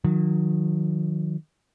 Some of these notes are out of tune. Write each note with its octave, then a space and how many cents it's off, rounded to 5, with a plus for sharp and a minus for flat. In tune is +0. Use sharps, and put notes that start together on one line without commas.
D#3 +0 F#3 -35